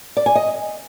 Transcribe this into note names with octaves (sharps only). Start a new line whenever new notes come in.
D5
G#5
D#5